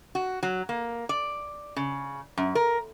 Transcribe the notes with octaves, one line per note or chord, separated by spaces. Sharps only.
F#4
F#3
A#3
D5
C#3
F#2
A#4